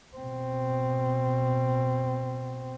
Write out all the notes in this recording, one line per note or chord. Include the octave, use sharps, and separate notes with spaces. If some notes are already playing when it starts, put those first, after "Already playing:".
B2 C4